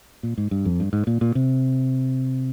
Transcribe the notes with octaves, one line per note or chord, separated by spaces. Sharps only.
A#2
G#2
G2
F2
G2
G#2
A#2
A#2
C3